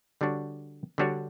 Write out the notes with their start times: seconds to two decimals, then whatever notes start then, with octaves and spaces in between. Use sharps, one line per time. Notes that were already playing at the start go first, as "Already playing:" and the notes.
0.21 D3 G3 D4 F#4 C#5
0.98 D3 G3 D4 F#4 C#5